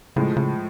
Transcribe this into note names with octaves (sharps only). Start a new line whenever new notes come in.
A2 C#3 F3 G#3
C#3